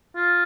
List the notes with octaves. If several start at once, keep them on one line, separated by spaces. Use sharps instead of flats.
F4